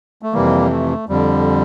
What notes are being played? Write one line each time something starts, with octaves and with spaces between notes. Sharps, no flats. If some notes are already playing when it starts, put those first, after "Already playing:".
A3
F2 C3 E3 G3 A#3
A3
F2 D3 G3